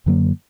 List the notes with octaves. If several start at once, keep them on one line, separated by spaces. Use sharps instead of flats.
F#2 D3 F#3 A#3